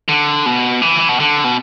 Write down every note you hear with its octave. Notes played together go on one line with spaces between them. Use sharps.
D3
B2
E3
B2
D3
B2